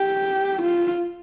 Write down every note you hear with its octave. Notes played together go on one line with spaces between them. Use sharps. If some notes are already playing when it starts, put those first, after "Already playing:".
Already playing: G4
F4